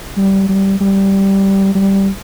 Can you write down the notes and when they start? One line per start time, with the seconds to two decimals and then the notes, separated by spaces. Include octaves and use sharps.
0.17 G3
0.49 G3
0.80 G3
1.75 G3